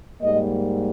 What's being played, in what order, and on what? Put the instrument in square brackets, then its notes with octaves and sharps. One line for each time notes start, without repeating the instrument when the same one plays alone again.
[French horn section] G#2 G3 A#3 D#5